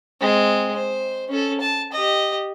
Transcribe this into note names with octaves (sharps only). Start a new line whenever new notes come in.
G#3 C4
C5
C#4 A4
A5
G4 D#5